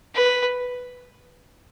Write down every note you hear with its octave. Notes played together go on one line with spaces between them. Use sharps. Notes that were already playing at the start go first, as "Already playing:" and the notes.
B4